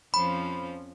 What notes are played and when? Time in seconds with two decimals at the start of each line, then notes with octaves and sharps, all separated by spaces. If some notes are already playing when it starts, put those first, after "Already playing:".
0.14 F2 F3 C#4 B5